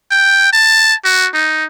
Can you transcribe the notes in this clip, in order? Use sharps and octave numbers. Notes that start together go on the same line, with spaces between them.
G5
A5
F#4
D#4